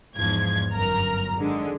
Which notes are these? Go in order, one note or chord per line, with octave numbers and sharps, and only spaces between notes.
E2 G#2 F3 G#6
G1 F#2 A#4 A#5 F6
G#1 D3 G#3